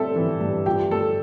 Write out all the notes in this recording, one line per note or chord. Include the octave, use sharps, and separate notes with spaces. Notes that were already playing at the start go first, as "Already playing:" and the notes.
Already playing: G3 C4 G4 A4 E5
E3
G2
F3 G4
A3 A4